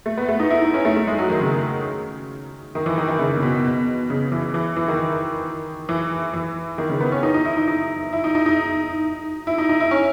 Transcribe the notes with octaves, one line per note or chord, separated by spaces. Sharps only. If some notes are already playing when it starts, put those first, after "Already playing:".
A3
B3
A3
D#4
E4
D#4
C#4
A3
A3
G#3
F#3
D#3
C#3
D#3
E3
D#3
D#3
C#3
C#3
B2
B2
C#3
E3
E3
E3
D#3
E3
E3
D#3
C#3
B3
C#4
D#4
D#4
E4
D#4
D#4
E4
D#4
D#4
D#4
E4
D#4
D#4
E4
C#4